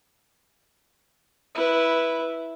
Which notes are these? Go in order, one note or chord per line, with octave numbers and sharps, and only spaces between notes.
E4 B4